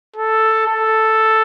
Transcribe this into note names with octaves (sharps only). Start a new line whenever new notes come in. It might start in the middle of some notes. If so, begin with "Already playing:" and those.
A4
A4